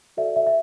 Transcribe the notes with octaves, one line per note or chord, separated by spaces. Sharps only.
F#4 A4 D5 E5
E5
E5